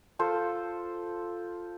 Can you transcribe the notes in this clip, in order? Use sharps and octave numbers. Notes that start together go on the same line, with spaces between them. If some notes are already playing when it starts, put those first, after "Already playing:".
F4 A4 C5